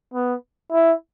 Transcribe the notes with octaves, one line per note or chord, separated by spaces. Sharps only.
B3
E4